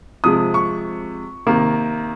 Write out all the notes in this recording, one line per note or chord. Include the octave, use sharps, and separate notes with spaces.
C3 F3 G#3 D#6
C#6
C3 D#3 A#3